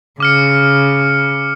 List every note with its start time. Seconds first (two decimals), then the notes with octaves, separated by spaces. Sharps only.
0.20 C#3 D6 F6 C#7